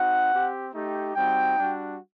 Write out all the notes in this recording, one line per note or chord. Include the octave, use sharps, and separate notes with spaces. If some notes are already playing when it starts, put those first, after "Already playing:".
Already playing: C4 D#4 F#4 F#5
C4 G4
A3 D#4 G4
G3 C4 D#4 F#4 G5
G3 D4 F#4